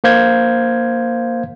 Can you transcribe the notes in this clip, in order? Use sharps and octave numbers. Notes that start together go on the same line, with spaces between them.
A#3 C5 F5 G6 G#6